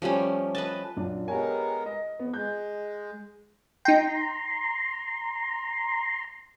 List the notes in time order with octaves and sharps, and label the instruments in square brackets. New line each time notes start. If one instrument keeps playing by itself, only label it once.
[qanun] F3 G3 A3 C#4
B4 D#5 A5
[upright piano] A#1 F#2 D4
[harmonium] G#3 B3 A#4 [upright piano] G4 C#5 G#5
[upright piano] D#5
[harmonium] F2 [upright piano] B3
[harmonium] G#3 [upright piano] F#6 G6
[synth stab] D#4 G5 [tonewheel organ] A#5 C6